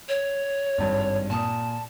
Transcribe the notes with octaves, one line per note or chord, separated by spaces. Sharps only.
C#5
G#1 G2
A#2 A5 D#6